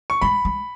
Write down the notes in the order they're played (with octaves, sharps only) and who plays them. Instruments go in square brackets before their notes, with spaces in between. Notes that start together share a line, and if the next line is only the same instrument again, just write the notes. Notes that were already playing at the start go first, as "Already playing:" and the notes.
[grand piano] C#6
[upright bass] G#3 [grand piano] B5
[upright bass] G#3